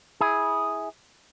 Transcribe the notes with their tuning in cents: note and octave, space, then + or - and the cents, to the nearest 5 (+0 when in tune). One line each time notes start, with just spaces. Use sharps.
E4 -20 G#4 +0